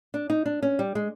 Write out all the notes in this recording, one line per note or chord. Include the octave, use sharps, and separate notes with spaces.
D4
D#4
D4
C#4
G3
G#3